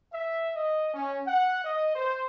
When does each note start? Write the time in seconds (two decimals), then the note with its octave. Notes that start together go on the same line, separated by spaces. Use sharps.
0.13 E5
0.55 D#5
0.94 C#4
1.27 F#5
1.64 D#5
1.95 C5